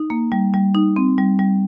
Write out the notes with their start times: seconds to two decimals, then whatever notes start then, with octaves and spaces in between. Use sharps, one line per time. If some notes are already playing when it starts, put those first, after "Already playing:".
Already playing: D#4
0.10 A#3
0.32 G3
0.54 G3
0.75 D#4
0.96 C4
1.18 G3
1.39 G3